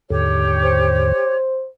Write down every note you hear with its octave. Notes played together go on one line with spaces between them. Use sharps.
D#2 G#2 D3 G4 C#5
C5